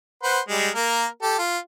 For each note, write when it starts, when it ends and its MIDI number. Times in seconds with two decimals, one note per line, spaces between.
0.23 0.40 71
0.23 0.40 72
0.23 0.40 78
0.48 0.69 55
0.48 0.69 56
0.75 1.06 58
0.75 1.06 70
1.22 1.37 67
1.22 1.37 69
1.38 1.58 65